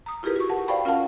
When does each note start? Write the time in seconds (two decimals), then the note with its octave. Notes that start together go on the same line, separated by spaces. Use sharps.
0.06 A#5 D#6
0.23 E4 F4 G4 G#4 A#4 B4
0.36 F#4 C#6
0.50 A#4 F#5 A5
0.68 C5 D5 F5 G5 B5 C#6
0.85 C#4 F4 A#4 F5 F#5 A5